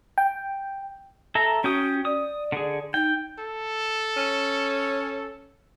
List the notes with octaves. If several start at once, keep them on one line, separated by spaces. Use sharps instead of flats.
G5
A4 E5 A#5
C#4 F#4 G5 D#6
D5 D#6
D3 G#4
D#4 G5
A4
C#4